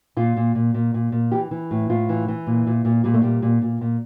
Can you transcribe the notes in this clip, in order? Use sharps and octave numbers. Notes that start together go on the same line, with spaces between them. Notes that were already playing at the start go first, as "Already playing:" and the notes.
A#2 F4
A#2
A#2
A#2
A#2
A#2
E3 G4
E3
A2
A2 F4
E3
E3
A#2
A#2
A#2
A#2 G3
A3
A#2 G3
A#2
A#2
A#2